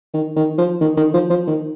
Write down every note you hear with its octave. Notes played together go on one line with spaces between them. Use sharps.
D#3
D#3
F3
D#3
D#3
F3
F3
D#3